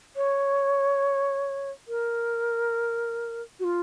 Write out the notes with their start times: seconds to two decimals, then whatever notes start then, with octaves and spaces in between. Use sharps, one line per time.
0.16 C#5
1.88 A#4
3.60 F#4
3.64 F4